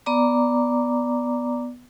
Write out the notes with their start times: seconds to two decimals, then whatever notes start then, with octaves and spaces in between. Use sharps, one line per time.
0.06 B3 D5 A#5 D6